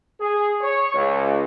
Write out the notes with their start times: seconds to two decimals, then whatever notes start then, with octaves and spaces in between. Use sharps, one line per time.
0.19 G#4
0.62 C#5
0.94 C#2